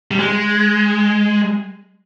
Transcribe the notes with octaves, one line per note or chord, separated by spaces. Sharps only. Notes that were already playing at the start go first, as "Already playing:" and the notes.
G3
G#3